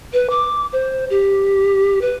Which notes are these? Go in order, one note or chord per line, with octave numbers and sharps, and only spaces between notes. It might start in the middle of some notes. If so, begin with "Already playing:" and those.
B4
D6
C5
G4
B4